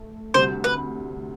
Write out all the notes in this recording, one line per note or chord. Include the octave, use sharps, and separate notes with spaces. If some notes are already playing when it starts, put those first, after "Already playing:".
Already playing: A3
D2 C3 G3 C5
B4